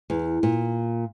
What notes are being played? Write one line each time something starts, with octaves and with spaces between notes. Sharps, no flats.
E2
A#2